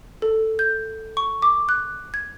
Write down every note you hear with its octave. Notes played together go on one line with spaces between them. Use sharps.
A4
G6
C#6
D6
F#6
G#6